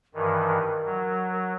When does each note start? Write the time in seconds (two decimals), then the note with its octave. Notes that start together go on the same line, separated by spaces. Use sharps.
0.14 G2 D#3 E3 A#4
0.85 F#3